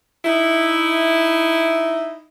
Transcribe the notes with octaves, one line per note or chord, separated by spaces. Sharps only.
D#4 E4